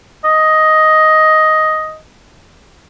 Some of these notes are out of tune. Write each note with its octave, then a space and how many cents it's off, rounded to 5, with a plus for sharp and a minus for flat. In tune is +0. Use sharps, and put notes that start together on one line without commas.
D#5 +5